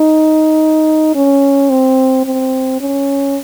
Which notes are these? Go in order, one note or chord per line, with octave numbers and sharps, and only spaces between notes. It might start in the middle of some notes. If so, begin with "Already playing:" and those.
Already playing: D#4
C#4
C4
C4
C#4